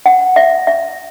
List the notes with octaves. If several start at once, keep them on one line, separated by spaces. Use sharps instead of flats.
F#5
E5
E5